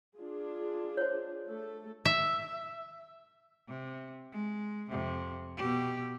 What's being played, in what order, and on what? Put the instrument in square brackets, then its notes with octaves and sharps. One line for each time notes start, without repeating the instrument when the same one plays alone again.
[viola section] D4 F4 G#4
[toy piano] C5 C#5
[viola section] A3 A4
[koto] E5
[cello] C3
G#3
F2 C3
B2 G4